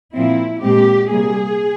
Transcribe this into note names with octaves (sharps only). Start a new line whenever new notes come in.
A#2 F3 C4 E4
A#2 G#3 C4 G4
C3 G3 A#3 G#4